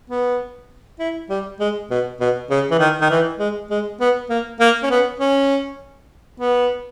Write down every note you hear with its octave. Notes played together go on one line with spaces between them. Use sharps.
B3
E4
G3
G#3
B2
B2
C#3
E3
D#3
D#3
E3
G#3
G#3
B3
A#3
A#3
C#4
B3
C#4
B3